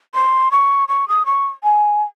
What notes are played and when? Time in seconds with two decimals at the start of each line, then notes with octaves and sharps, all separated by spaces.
0.14 C6
0.51 C#6
0.88 C#6
1.08 D#6
1.26 C#6
1.63 G#5